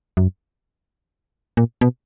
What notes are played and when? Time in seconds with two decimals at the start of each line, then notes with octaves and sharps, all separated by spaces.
0.17 F#2
1.57 A#2
1.81 B2